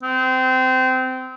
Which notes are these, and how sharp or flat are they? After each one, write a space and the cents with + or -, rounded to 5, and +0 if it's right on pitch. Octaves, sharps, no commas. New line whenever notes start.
C4 -25